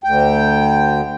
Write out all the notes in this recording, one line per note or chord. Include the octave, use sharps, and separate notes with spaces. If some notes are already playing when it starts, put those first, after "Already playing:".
D2 G5